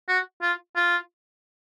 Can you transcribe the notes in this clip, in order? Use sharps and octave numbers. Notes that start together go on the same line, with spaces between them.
F#4
F4
F4